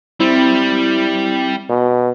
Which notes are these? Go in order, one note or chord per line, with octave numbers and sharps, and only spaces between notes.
G3 C4 E4
B2